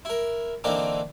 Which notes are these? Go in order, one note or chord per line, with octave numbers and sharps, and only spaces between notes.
E4 A#4
D3 E3 A#3 C4 D4 D#4